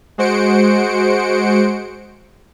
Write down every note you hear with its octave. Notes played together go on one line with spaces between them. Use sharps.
G#3 F#4 C5 C#7 D7